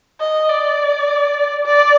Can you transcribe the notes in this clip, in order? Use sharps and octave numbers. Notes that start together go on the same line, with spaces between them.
D#5
D5
D5